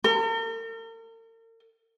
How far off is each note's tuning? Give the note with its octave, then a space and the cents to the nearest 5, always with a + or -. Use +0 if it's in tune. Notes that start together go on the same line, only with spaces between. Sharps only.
A#4 -45